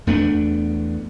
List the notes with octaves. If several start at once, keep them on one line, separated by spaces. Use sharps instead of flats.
E2 A3 B3 D4